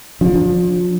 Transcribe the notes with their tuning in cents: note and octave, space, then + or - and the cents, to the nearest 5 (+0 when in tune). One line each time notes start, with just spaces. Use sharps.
F3 +35 D4 +0